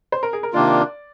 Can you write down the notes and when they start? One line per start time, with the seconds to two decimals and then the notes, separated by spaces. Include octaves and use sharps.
0.12 C5
0.23 A#4
0.33 G#4
0.43 A#4
0.53 C3 D#3 A#3 D4 F4 D5